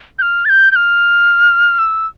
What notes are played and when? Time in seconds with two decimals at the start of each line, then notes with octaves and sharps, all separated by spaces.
0.19 G6
0.22 F6
0.45 A6
0.49 G6
0.72 G6
0.76 F6
1.79 E6